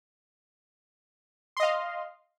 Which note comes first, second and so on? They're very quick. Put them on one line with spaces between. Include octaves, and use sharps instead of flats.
C6 D#5 F5